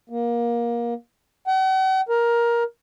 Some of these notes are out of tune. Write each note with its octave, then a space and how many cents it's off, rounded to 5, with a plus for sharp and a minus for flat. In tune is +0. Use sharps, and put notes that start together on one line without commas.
A#3 +20
F#5 +45
A#4 +15